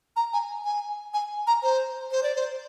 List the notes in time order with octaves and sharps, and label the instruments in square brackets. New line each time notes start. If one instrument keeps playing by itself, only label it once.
[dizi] A#5
G#5
G#5
G#5
A#5
C5
C5
D5
C5